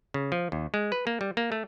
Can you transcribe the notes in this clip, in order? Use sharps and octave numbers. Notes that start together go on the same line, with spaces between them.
C#3
F3
D#2
G#3
B4
A#3
G3
A#3
A3